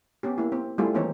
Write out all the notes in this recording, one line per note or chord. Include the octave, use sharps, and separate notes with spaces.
B3 C#4 G4
A#3 E4
C4
G3 A3 C4 E4 F4 G#4
D#3 E3 A#3 C4 D#4 C#5